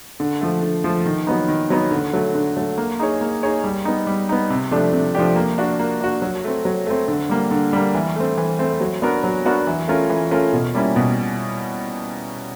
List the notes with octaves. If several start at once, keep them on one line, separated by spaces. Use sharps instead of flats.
D3
F3 A3
D3
F3 A3
D#3
F#3 B3 D#4
D#3
F#3 B3 D#4
D3
F#3 A3
D3
F#3 A3
A#3
D#4 G#4 C#5
A#3
D#4 G#4 C#5
G3
B3 D#4
G3
B3 D#4
C3
F3 A3 D4 G4
C3
F3 A3 D4 G4
A#3
D4 F#4
A#3
D4 F#4
F#3
A3 C4
F#3
A3 C4
D3
G3 A#3
D3
G3 A#3
E3
A3 C4
E3
A3 C4
F#3
B3 D4 F#4 A#4
F#3
B3 D4 F#4 A#4
E3
A3 C#4 F4 A#4
E3
A3 C#4 F4 A#4
B2
G3 A#3 C#4 E4
B2